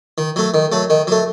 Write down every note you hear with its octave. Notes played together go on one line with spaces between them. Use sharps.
D#3
F#3 A3
D#3
F#3 A3
D#3
F#3 A3